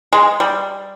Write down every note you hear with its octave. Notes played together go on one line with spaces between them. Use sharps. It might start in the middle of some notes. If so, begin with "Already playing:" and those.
G#3
G3